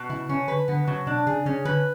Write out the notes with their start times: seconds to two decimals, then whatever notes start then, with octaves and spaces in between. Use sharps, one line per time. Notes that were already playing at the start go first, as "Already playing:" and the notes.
Already playing: B2
0.10 C#3 E4
0.29 C#3 C#4
0.48 D3 B4
0.68 D3 B3
0.87 C#3 F#3
1.07 B2 D4
1.27 C#3 G#4
1.46 C#3 C#4
1.65 D3 B4